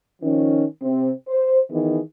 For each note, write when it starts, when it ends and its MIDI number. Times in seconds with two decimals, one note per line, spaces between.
0.22 0.63 51
0.22 0.63 53
0.22 0.63 61
0.81 1.10 48
0.81 1.10 60
1.27 1.58 72
1.70 1.98 51
1.70 1.98 52
1.70 1.98 59
1.70 1.98 68